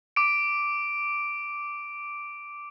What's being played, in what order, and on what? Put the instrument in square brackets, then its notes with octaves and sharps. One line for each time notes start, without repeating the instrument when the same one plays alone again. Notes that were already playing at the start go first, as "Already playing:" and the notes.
[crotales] D6 D7